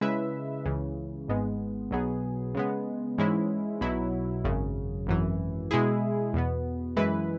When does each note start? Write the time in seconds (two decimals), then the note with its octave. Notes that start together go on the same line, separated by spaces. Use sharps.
0.01 C#3 G#3 E4 B4 E5
0.65 C#2 C#3 E3
1.28 G#1 G#2 G#3 B3
1.91 B1 B2 F#3 B3 G#4
2.55 C#3 G#3 B3
3.18 G#2 E3 G#3 C#4 E4
3.81 B1 B2 F#3 E4
4.44 G#1 F#2 C#3
5.07 G#1 F#2 E3
5.71 B2 G#3 E4 G#4
6.33 E2 B2 B3
6.96 F#2 E3 G#3 E4 B4